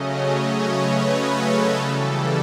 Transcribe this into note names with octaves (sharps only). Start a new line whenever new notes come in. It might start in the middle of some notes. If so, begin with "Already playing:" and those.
Already playing: C#3 F#3 A3 C#4 D#5
C#5
B4
A4
C#3 E3 G3 A4